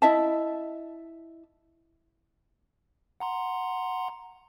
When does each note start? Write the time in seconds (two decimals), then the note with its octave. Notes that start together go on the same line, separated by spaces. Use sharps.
0.02 E4 D#5 E5 A5
3.20 F#5 A#5 C6